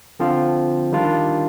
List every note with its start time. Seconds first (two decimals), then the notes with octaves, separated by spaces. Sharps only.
0.20 D3 F3 C4 F4
0.92 D#3 G3 D4 F4